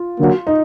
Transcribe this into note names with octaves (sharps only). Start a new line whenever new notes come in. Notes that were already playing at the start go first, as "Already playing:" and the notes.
Already playing: F4
D3 F#3 A#3 D4 F#4
D#4